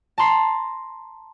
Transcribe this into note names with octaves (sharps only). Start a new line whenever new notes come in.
A5 A#5 C6 C7